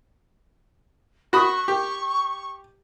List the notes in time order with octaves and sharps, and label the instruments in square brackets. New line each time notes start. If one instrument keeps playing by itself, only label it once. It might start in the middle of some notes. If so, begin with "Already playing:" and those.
[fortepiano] F#4 B5 D#6 [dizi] C#6
[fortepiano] G4